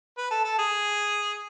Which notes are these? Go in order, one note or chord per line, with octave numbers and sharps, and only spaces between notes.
B4
A4
A4
G#4